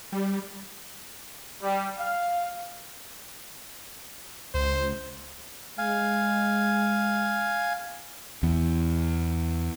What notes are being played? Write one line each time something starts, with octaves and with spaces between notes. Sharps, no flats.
G3
G3
F5
C#2 C5
G#3 F5 G#5
E2